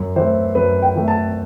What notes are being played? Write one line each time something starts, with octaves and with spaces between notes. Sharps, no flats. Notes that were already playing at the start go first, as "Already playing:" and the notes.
Already playing: F#2
E3 A3 C5
F#2 B4
G5
E3 A3
A5